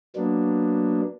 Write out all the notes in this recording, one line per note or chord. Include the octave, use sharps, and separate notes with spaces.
F#3 A#3 B3 D4